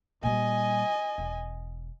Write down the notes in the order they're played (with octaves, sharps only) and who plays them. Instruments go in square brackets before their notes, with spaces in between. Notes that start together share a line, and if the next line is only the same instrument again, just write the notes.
[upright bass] A#2 G3 [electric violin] D#5 G#5
[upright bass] E1